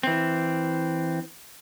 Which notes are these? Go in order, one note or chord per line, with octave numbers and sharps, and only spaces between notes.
E3 C4